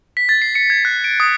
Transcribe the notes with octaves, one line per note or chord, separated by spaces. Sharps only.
B6
A6
C7
C#7
G#6
F#6
D7
D#6